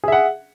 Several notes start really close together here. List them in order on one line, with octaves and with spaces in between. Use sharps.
G#4 E5 F#5